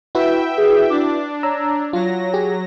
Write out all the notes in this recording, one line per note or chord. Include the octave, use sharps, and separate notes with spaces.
E4 F#4 B4 E5 G5
G#4
D4 D6
C#5 A#5 E6
F#3 F4 A#6
G4 G#4